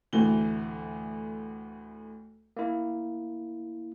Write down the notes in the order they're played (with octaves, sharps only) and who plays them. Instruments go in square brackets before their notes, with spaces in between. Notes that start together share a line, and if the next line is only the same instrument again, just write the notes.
[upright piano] D2 A2 E3 G7
[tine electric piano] A#3 E4